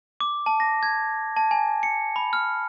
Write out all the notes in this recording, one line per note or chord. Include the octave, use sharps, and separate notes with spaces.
D6
A5
A#6
G#6
A5
G#5
C#7
B5
F6